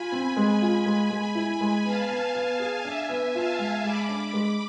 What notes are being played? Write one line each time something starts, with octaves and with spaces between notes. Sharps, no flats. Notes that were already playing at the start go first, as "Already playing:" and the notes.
Already playing: F4 G#5 B5
C4
G#3
F4
G#3
G#3
E4
G#3
B3 F5 A5
B3
B3
G#4
D4 E5 G#5
B3
F4 F5 A5
G#3
G#3 B5 D6
D4
G#3 B5 D6